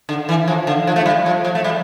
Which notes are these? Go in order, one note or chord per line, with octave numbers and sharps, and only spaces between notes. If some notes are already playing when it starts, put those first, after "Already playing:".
D3
E3
F3
D3
F3
A3
G3
F3
F3
A3
G3